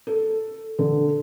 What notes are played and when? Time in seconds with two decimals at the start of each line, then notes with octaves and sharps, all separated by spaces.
0.07 A4
0.79 D3